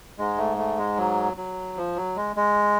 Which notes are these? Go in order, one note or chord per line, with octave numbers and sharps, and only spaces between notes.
G#2 G#3
A3
A3
G#3
F#3
F#3
F3
F#3
G#3
G#3